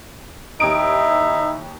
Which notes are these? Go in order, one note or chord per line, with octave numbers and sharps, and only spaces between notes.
D#2 D#4 E4 E5 D#6 D7